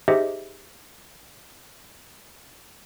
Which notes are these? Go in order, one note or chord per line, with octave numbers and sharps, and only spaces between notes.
D#4 G4 G#4 C5 D#5 E5